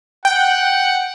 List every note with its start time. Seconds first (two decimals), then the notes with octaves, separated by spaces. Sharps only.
0.25 F#5 G5